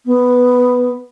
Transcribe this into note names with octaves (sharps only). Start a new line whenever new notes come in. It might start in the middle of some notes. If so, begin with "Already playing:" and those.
B3